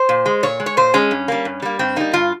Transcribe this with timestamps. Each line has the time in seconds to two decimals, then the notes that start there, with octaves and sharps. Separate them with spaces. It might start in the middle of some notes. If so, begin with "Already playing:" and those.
Already playing: C5
0.09 A#2
0.26 G#3
0.43 A#2 C#5
0.60 G#3
0.66 C#5
0.77 A#2 C5
0.94 G#3 C#4
1.11 G2
1.28 G3 A#3
1.45 G2
1.62 G3 A#3
1.79 G2 C4
1.96 G3 A#3 D#4
2.13 G2 F4